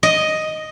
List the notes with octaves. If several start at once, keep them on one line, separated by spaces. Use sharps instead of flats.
D#5